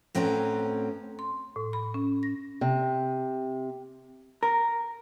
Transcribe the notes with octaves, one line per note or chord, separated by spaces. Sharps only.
A2 C4 C#4 F#4 B4 A#5
C6
A2
B5
C#4
A#6
C3
A#4